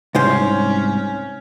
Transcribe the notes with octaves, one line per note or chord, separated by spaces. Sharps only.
C2 G#2 C#4 C5